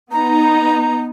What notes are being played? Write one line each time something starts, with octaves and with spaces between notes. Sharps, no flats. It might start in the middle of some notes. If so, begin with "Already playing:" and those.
B3 D#4 A#5